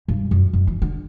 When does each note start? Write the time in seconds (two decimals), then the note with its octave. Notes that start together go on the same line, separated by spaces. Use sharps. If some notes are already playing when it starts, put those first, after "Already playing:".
0.08 G2
0.31 F#2
0.53 F#2
0.67 E3
0.82 D3